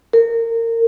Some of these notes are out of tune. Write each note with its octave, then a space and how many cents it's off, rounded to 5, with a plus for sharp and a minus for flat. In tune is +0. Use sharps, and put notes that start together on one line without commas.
A#4 -25